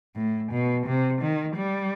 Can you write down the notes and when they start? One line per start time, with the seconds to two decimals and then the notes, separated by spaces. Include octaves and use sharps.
0.16 A2
0.52 B2
0.86 C3
1.21 D#3
1.56 G3